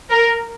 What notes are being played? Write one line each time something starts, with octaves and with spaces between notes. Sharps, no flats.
A#4